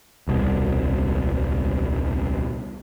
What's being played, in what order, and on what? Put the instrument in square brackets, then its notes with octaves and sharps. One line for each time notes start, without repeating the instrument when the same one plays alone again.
[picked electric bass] D#1 C2 B2